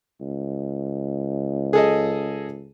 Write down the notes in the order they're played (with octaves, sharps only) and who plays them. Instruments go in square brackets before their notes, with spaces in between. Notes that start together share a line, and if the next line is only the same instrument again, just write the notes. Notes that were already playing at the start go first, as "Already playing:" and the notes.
[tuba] C#2
[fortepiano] G#4 A4 D#5